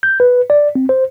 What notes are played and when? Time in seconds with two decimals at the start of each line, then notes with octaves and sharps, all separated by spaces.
0.03 G6
0.20 B4
0.50 D5
0.75 C4
0.89 C5